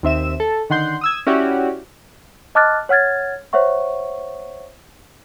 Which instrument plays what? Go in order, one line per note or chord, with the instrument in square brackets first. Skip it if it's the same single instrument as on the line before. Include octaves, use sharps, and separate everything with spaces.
[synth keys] D#2 C4 E5 E7
A4
D3 D#3 F#5 C6 G6
D#6 E6 G#6
C#4 E4 F#4 G4 D5
[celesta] D#5 A5 D6 F6 F#6 A6
C#5 F#5 F6 G#6 A6
C5 C#5 E5 F#5 C#6